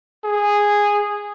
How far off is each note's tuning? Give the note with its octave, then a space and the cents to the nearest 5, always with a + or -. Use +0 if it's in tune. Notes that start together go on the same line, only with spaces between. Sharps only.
G#4 -10